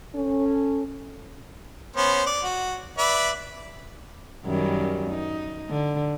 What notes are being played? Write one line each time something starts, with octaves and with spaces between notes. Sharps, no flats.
C#4 A4
B3 C#4 C5
D5
F#4
B4 D5 E5
F#2 D#3 G3
D#4
D3